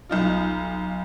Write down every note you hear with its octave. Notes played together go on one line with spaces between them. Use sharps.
B1 D#4 F4